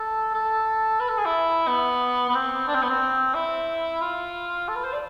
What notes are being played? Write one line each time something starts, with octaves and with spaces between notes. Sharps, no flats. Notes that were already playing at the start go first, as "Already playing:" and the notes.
Already playing: A4
A4
B4
A4
G#4
E4
B3
B3
C4
D4
C4
B3
C4
E4
F4
A4
B4
C5
D5